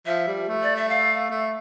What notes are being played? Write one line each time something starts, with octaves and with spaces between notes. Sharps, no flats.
F3 E5
G3
A3
D5
E5
F5
A3